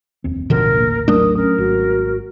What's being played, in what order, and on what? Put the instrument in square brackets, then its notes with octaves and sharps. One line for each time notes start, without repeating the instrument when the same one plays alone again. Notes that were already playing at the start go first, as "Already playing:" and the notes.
[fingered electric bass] F1 D#2 C4
[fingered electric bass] D#1 A1 [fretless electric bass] B2 D3 F3 [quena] A#4
[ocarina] A#3
[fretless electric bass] F#3 A3 D4 [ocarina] A#4 [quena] D#6
[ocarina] C#4 [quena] A#4
[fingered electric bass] G#1 [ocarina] F#4